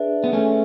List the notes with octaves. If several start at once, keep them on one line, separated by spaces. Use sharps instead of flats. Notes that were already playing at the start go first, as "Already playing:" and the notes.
Already playing: D4 G#4 B4 E5
B3
A3 C#4